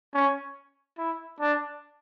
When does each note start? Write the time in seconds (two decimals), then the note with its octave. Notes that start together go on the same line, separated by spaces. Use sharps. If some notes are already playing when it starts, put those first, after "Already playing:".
0.14 C#4
0.98 E4
1.40 D4